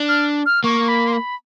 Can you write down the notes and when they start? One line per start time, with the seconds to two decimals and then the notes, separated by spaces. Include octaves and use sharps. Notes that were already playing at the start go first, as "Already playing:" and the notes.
Already playing: D4
0.09 F6
0.46 F6
0.64 A#3 C#6
0.88 B5
1.08 C6
1.13 B5